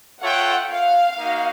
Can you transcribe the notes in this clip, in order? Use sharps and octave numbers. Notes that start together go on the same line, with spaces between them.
F4 A4 C#5 E5 F#5 G5
F5
A#3 D#4 F#4